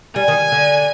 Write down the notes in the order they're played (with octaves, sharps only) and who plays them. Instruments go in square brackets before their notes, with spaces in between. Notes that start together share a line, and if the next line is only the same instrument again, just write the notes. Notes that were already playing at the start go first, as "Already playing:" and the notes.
[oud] G3 [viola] G#5
[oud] D#3
D3